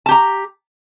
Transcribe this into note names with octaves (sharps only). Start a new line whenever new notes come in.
G4 A5 A#5